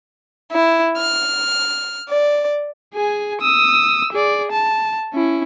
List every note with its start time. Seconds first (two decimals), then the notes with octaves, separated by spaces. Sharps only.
0.51 E4
0.99 F6
2.10 D5
2.94 G#4 G#5
3.41 D#6 E6
4.12 G#4 D5
4.51 A5
5.13 C#4 E4